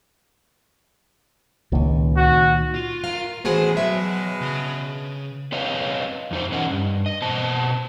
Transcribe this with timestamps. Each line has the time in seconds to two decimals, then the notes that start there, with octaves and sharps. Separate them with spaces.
1.72 C#2 A#2 D#3
2.17 F#4
2.74 F4
3.04 A#4 F5
3.45 B2 E3 G#3 A3 F#4 G#4 B4 C5
3.77 F#3 E5
4.41 C#3 B5
5.52 C4 B4 C#5 D#5 F5
6.31 F2 D#4 C5
6.52 E3 C#4 A#4 D#5 F#5
6.71 G2
7.06 D#5
7.22 B2 C4 C5 A5